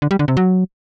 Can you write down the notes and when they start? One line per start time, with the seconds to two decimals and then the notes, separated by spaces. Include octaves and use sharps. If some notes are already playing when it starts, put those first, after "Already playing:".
0.02 D3
0.11 G3
0.19 D3
0.28 C3
0.37 F#3